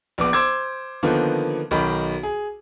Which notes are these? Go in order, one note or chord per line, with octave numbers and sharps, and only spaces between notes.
A#1 B3 D6
C5 D6 E6 G#6
D3 D#3 F3 A#3 B3
B1 D#3 B5
G#4